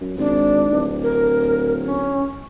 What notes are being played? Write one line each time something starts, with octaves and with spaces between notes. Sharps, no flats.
F#2
G#1 D4
D1
A#4
C#4